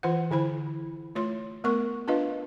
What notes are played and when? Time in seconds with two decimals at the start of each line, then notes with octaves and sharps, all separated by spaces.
0.03 E3 F4 C5 F#5
0.31 D3 E4 C5 B5
1.15 A3 F4 C#5 C6
1.64 A3 B3 A#4 C#6
2.08 D4 F4 B4 D#5 F5